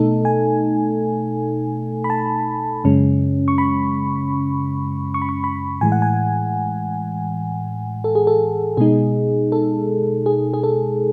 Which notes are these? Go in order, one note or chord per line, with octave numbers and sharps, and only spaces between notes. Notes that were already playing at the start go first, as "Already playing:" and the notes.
Already playing: B2 A3 D#4 A4
G#5
B5
A5
F#2 C#3 G#3 C#4
C#6
B5
C#6
B5
C#6
B5
A2 E3 G#3 G#5
F#5
G#5
A4
G#4
A4
B2 G#3 D#4 G#4
A4
G#4
G#4
A4